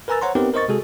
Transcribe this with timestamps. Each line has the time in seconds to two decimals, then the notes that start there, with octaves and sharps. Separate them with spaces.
0.08 A#4 B4 G#5 A#5 E6 A6
0.22 C5 C#5 F#5 A#5 C6
0.35 B3 C4 D#4 G4 A#4 B4
0.54 A#4 C5 D#5 C#6 A6
0.68 C3 G#3 F#4 G#4 A4